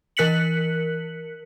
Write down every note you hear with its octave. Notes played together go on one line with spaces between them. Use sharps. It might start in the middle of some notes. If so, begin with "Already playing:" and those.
E3 A#4 F#6 B6 C#7 F#7